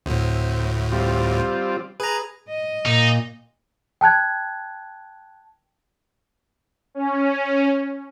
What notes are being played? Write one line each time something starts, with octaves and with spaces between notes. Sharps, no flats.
D2 A2 C4
G3 C4 F4
G#4 B4 A#5
D#5
A#2 D#4
G5 A5 F#6 G#6
C#4